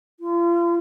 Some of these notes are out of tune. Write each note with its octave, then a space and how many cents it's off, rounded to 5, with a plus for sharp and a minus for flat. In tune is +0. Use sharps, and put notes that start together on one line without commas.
F4 -35